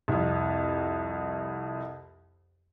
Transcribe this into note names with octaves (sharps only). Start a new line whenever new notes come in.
C2 F2